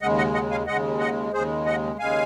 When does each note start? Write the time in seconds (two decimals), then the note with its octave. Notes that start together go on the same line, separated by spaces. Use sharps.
0.02 D#2 C#3 G#3 D#5 F#5
0.17 D#5 F#5
0.34 D#5 F#5
0.51 F5 G#5
0.67 D#2 C#3 G#3 D#5 F#5
1.00 D#5 F#5
1.33 D#2 C#3 G#3 G#4 C5
1.66 D#5 F#5
1.99 D#2 C#3 G#3 F5 G#5